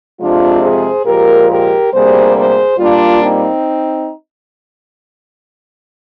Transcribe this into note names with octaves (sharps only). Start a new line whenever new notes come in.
F2 C3 F3 G#3 D4 F4
G#4 C5
A#2 F3 G#3 G4 A#4
G4 A#4
D2 C3 G3 A#3 G#4 C5
G#4 C5
A#2 G3 A#3 D4 F4
C4 D#4